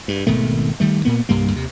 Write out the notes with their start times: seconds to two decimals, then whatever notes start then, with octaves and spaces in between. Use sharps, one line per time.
0.08 G2
0.27 G#1 B2 D#3 A3
0.80 D#3 G3 A3
1.05 A#2 A#3 B3
1.29 C2 G2 G3 A#3
1.52 D#2 C3